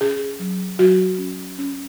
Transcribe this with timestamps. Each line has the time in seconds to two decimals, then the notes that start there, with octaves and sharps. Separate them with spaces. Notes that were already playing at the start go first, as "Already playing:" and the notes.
0.01 C#4 G#4
0.40 F#3
0.79 F#3 F#4
1.18 C#4
1.59 C#4